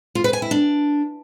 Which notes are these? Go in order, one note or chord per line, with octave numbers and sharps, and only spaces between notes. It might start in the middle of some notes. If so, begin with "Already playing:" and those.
F4
B4
G#5
E4
D4